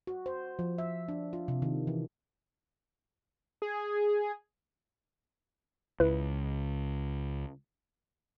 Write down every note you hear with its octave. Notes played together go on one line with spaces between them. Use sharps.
F#4
C5
F3
E5
D4
F4
C3
D#3
E3
G#4
C#2 E4 B4